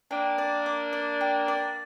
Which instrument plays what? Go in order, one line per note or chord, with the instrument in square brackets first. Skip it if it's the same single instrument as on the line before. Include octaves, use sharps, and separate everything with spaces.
[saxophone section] A#3 D4 [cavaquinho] G5
[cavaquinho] D5
D6
D5
G5
D5